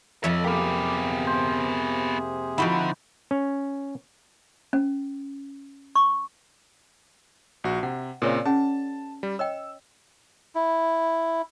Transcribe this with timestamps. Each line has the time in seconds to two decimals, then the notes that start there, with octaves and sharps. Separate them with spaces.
0.24 F2 A4 C#5 D#5 E5
0.44 C3 A#3 B3 G4 G#4 D6
1.27 C5
2.58 D3 F3 C4 D#4 E4 F#4 B5
3.31 C#4
4.73 C#4
5.95 C#6
7.64 A#1 F#4
7.83 C3 F#5
8.22 A#2 C#3 C4 A#4 C#5 D5
8.46 C#4 G#4 F#5 A5
9.23 G3
9.39 C#5 D#5 G5 E6
10.55 E4